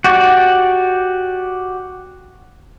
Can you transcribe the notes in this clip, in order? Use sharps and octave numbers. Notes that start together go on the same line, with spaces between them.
F#4 G4 D5